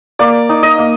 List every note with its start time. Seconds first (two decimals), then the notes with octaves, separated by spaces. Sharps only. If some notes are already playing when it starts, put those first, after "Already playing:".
0.19 A#3 D5
0.49 D#4
0.63 D#5
0.79 A#3